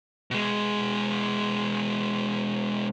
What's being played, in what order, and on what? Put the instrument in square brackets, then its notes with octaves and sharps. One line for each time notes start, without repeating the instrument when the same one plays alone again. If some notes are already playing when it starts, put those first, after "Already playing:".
[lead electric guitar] B2 G#3